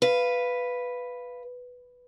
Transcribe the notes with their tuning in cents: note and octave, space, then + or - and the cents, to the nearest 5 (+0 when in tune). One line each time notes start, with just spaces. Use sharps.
B4 +0 F5 -10